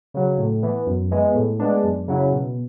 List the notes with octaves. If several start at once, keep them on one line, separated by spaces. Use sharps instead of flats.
C#3 F#3
A2
E3 B3
F#2
E3 G#3 B3
A2
G#3 B3 D4
F#2
C#3 F#3 C#4 E4
B2